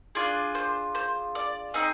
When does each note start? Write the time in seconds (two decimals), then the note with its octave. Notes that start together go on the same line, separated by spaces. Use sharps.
0.15 D4 F4 G#4 D5
0.55 C5
0.95 C5
1.35 D5
1.74 C4 D#4 G#4 D#5